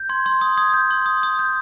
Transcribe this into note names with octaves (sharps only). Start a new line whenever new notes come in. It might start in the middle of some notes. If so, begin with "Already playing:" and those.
Already playing: G6
C6 G#6
C6
D#6
D#6 G#6
G6
C6
D#6
D#6
G6